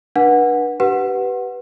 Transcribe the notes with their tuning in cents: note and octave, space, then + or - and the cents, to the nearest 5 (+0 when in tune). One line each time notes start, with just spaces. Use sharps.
D4 +20 B4 -30 F#5 -5
G4 -25 B4 +0 F#5 +0